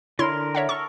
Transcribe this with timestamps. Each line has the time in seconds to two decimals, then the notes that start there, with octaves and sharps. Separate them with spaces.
0.19 D3 E4 A#4 C#5 C6
0.55 C#5 E5 F#5
0.69 A4 A#4 C#6